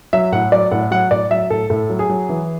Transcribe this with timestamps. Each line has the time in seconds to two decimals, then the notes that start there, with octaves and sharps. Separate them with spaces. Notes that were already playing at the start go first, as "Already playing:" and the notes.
0.13 F#3 E5
0.32 A2 F#5
0.52 F#3 D5
0.71 A2 F#5
0.91 F#3 F#5
1.11 A2 D5
1.31 F#3 E5
1.50 A2 A4
1.70 A2 A4
1.90 F#3
1.99 G#4
2.10 F#3
2.29 E3